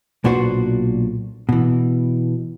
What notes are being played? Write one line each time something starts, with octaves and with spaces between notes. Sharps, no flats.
B1 A#2 D4 F#4 B4 C5
B2 E3